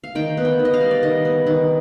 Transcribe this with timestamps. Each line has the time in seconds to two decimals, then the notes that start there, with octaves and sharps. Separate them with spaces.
0.04 F5
0.15 D#3 G5
0.37 B3
0.45 G5
0.59 D#3
0.65 D#5
0.74 F5
0.81 G3
0.91 D5
1.03 D#3 D#5
1.25 B3
1.47 D#3